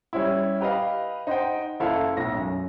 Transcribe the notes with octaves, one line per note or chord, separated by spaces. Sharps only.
G3 C#4 E4
G4 B4 D#5 F5
D#4 C5 F#5 G5
F#1 E4 A4 F5
B1 A2 A#6
F#2